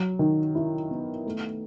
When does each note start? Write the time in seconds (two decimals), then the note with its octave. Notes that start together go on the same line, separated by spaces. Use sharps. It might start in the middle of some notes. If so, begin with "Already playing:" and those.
Already playing: F#3
0.19 D#3
0.55 E4
0.91 B3
1.26 A3